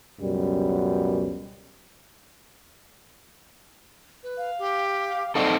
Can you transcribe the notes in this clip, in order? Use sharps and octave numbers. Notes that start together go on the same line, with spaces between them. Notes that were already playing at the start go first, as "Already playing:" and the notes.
C#2 F#2 B2 G3
B4
F5
G4
C4 D#4 A4 D5